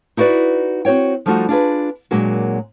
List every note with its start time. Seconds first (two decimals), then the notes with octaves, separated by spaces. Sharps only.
0.17 D#4 E4 F#4 B4 D5
0.85 C4 F#4 C5 C#5 G5
1.26 F3 G3 A3 D#4 F4 F#4
1.49 D4 F4 G#4 B4
2.11 A#2 F#3 G#3 A#3 D4 F#4